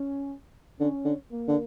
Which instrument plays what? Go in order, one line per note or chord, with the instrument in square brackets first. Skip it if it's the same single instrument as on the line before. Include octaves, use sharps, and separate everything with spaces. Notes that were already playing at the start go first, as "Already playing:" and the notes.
Already playing: [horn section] C#4
[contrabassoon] D3 [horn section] C#4
[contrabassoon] D3
[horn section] A#3
[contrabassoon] D3